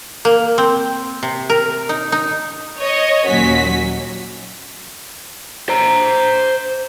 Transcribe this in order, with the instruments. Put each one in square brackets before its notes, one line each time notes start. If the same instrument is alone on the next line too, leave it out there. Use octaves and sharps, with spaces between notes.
[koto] A#3
C4
C3
A#4
D#4
D#4
[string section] C#5 D#5
D#2 A#2 F#3 C#4 F#4 B6
[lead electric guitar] C5 A#5